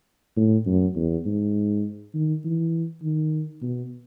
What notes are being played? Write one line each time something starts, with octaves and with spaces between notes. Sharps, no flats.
A2
F#2
E2
G#2
D#3
E3
D#3
B2